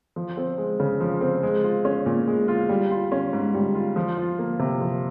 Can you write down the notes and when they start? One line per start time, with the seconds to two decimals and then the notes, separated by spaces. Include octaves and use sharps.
0.16 F3
0.37 C4
0.58 G#3
0.80 C#3
1.00 F3
1.21 C4
1.43 G#3
1.64 F4
1.85 C#4
2.06 A#2
2.27 G#3
2.48 F4
2.69 G3
2.91 F4
3.12 C#4
3.33 G#2
3.54 G3
3.75 F4
3.96 F3
4.18 F4
4.39 A#3
4.59 C3
4.81 F3